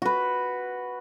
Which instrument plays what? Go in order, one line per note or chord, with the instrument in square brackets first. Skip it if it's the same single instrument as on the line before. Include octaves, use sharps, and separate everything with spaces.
[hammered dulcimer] F#4 B4